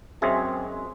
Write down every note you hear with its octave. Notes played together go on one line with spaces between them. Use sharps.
F#2 G#3 C4 G#4 E5